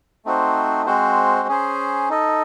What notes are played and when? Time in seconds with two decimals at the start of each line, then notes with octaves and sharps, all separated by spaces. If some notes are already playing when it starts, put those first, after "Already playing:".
0.25 A3 C4 D#4 F#4 C5
0.86 G#3 C4 F#4 C5
1.48 C#4 G#4 C5
2.10 D#4 A4 D#5